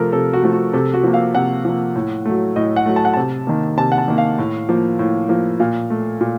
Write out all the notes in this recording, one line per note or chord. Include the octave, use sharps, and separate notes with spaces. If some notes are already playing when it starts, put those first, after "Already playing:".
Already playing: C3 F3 A3 A4 A#4
C3 A4
F#4
F3 A3
F#4
C3 A4
F#4
F3 A#3
F5
C3 F#5
F3 A#3
A2
F#3 A3
A2 D#5
F#5
F#3 A3
A5
F#5
C3 A5
D#3 A#3
C3 A5
F#5
A5
D#3 A#3
F5
A2
F3 A#3
A2
F3 A#3
A#2 F5
A3
A#2